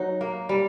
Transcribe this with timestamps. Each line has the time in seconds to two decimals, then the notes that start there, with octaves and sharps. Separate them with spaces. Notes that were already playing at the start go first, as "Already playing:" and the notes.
Already playing: F#3 D#4 F#4
0.21 A#3
0.49 G3